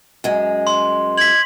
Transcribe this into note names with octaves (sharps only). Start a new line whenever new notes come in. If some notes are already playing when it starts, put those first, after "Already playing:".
F#2 G#3
C6
G#6 B6 F#7